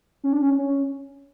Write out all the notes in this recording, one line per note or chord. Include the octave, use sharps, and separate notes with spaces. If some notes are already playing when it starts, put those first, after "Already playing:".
C#4
D4
C#4
C#4